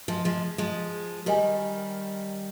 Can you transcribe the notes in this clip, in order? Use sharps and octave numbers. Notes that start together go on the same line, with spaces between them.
F3 G#3
F3 G#3
F3 G#3
D#3 G3 G4 A#4 D#5 G#5